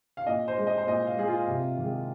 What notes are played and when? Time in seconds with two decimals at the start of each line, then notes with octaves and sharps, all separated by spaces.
0.17 F5
0.27 A#2 D#5
0.48 C5
0.58 G#3
0.67 D#5
0.78 C5
0.87 A#2 D#5
1.07 F5
1.17 G#3 G#4
1.28 F4
1.48 C3
1.77 D#3 G#3